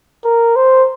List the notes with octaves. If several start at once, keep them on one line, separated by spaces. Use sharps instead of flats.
A#4
C5